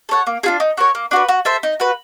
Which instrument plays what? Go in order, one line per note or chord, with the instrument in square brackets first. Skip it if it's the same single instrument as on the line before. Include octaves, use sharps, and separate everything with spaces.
[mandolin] A4 C#5 F#5
A#3
D4 F4 G#4
D#4
F#4 A#4 C#5
A#3
D4 F#4 B4
F#4
A4 C5 E5
D#4
F#4 B4